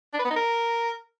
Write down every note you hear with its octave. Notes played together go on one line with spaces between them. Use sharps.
D4
B4
B3
D#4
A#4